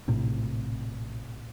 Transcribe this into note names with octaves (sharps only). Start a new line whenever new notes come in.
A#1 A2 C3